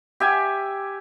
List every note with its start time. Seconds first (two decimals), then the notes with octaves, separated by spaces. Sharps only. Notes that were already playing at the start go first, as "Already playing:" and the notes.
0.20 G4 E5 G#5